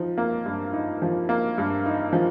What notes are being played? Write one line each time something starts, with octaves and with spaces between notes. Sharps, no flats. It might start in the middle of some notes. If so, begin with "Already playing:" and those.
Already playing: F3 D#4
A#3
G2
D#4
F3
A#3
G2
D#4
F3